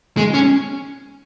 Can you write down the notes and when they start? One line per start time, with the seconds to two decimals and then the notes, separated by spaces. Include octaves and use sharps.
0.17 G#3
0.34 C#4